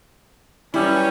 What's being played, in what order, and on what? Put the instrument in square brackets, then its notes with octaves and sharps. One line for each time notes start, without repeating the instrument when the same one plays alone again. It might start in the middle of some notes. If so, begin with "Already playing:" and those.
[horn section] F#2 E3 G3 C#4 [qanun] E4